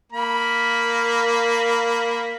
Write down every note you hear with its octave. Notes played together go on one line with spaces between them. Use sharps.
A#3 B5